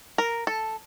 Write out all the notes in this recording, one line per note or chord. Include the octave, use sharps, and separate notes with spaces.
A#4
A4